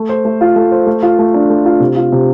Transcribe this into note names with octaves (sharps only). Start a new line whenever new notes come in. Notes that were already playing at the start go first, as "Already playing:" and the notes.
Already playing: A3
C5
A3
F4
A3
C5
A3
F4
A3
D4
A3
F4
C3
F4
C3